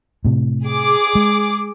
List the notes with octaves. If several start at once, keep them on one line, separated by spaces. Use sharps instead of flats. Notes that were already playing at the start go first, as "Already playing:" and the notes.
A2 C3
G#4 D6
G#3